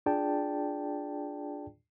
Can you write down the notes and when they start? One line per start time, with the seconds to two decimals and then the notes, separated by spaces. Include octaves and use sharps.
0.06 D4 F4 G#4 D5 G5 A5